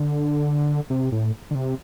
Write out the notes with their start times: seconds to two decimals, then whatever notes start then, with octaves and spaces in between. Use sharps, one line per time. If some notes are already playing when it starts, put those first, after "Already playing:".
Already playing: D3
0.90 C3
1.12 A2
1.51 D3
1.55 C3